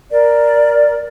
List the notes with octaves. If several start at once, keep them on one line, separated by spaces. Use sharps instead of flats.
A#4 D5